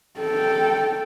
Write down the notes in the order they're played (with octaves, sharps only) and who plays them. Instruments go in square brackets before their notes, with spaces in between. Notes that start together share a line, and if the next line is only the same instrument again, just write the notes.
[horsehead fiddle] A4 G5